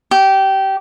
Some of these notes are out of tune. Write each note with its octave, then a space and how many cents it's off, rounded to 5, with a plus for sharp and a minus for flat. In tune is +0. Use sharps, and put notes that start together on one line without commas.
G4 -20